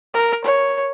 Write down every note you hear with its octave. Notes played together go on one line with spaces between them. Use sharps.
A#4
C#5